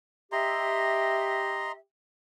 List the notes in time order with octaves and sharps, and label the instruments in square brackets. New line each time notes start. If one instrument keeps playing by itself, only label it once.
[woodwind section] G4 E5 [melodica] D#5 A#5 C6